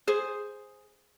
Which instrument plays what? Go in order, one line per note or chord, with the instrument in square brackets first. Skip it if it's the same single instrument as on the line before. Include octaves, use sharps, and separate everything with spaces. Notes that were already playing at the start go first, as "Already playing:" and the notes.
[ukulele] G#4 C5